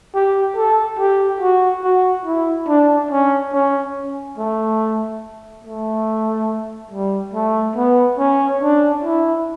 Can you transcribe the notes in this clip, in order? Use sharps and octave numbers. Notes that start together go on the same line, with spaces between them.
G4
A4
G4
F#4
F#4
E4
D4
C#4
C#4
A3
A3
G3
A3
B3
C#4
D4
E4